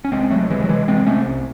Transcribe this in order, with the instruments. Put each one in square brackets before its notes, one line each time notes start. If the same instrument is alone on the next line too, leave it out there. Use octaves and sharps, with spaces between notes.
[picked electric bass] C#4
C2 G#3 C4
C2 F#3 A3
C3 E3 G#3
F#3
C3 E3 G#3
C3 G#3 C4
C3 A3 C#4
C2